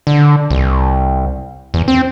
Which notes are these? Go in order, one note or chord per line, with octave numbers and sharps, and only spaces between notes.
D3
C2
E2
C4